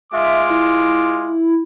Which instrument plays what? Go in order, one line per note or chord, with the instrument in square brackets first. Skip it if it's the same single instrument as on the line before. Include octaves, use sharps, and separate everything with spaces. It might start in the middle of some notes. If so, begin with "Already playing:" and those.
[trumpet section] G#3 F4 D6 [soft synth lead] E5
[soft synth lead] E4